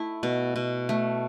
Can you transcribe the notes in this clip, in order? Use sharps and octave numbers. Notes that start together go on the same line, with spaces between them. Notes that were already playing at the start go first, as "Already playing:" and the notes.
Already playing: A3 E4
B2
B2
A3